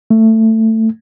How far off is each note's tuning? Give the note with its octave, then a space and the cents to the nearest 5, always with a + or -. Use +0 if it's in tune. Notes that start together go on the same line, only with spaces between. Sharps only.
A3 +15